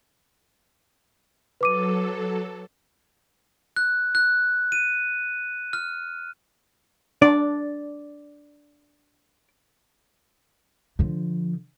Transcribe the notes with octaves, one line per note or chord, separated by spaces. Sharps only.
F#3 A4 B4 D6 D#7
F#6
F#6
D#7
F6
D4 D5
D3 F3